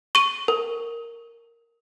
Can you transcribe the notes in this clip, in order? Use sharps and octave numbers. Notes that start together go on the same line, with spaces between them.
C#6 D#7
A#4